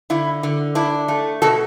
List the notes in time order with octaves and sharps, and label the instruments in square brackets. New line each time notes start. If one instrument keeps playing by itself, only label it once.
[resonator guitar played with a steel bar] D3 E4
D3
D4 E4
A3
B2 F#4 A4